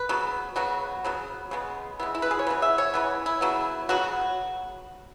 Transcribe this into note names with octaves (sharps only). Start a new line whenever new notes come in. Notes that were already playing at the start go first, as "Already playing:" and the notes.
Already playing: B4
C#3 F#3 B3
C#3 F#3 B3 F#4
C#3 F#3 B3
C#3 G#3 B3
C#3 G#3 B3 E4
E4
B4
G#4
C#5
C#3 E3 B3 B4
E5
C#5
C#3 E3 B3 B4
E4
C#3 F#3 B3
C#3 F#3 B3 F#4